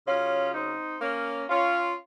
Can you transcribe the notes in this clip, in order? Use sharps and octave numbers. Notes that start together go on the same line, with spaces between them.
C#3 F#3 C#4 F4
C4 D#4
A#3 C#4
C#4 F4